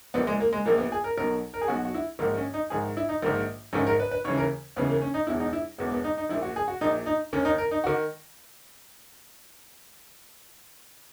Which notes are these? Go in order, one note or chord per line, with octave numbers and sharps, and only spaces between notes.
A#1 A#2 B3
G#3
A#3
G#3
A#1 A#2 A#3
B3
G#4
A#4
B1 B2 A#4
A#4
G#4
B1 B2 F#4
F#4
E4
A#1 G#2 D#3 A#3
C#4
D#4
A#1 G#2 D#3 G#4
E4
D#4
A#1 G#2 D#3 A#3
A#1 G#2 D#3 C#4
A#4
B4
B4
D#2 C#3 E3 C#5
A#4
D#2 C#3 E3 B3
A#3
C#4
D#4
E1 E2 B2 E4
D#4
E4
E1 E2 B2 B3
B3
D#4
D#4
A#1 A#2 E4
F#4
G#4
F#4
A#1 A#2 D#4
D#4
D#2 D#3 C#4
D#4
A#4
D#4
F#4
D#3